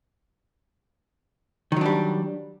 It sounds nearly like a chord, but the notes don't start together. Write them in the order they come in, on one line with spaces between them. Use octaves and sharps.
D#3 F#3 D4 G3